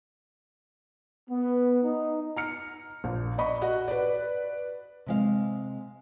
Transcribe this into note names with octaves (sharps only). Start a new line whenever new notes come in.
B3
D#4
A#5 F6 C#7
A#1 A#2
D5 D#5 B5 C#6
F#4 D#5 F#5
B4 D5
C3 G#3 F5